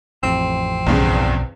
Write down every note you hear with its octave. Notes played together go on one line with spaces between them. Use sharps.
A1 F2 C4
B1 E2 G2 C#3